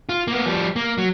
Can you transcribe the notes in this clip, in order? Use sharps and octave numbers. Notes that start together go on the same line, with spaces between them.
F4
A#3 B3
F3 G3
A#3
F#3